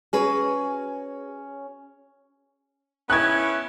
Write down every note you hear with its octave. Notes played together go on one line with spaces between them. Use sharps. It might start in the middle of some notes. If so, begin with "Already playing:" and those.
C#4 F#4 G#4 B4
B3 C#4 E4 F#6 G#6